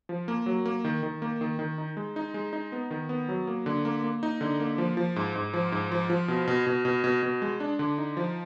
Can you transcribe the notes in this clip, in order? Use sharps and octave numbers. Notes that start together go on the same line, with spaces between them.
F3
A#3
F#3
A#3
D#3
D#3
A#3
D#3
D#3
D#4
G#3
D#4
G#3
D#4
B3
D#3
B3
F#3
A#3
D3
A#3
A#3
D#4
D3
A#3
F3
F3
G#2
G#2
F3
G#2
F3
F3
B2
B2
B2
B2
B2
B2
G#3
D4
D3
D#4
F3